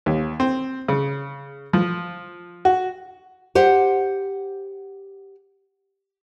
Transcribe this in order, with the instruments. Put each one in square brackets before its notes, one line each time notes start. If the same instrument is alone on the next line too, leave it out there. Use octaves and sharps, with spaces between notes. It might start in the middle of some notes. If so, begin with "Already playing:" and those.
[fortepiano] D#2
C4
C#3
F3
F#4
[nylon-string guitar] G4 C5 F#5